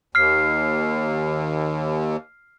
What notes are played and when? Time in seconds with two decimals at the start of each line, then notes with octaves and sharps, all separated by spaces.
0.15 D#2 F6 C7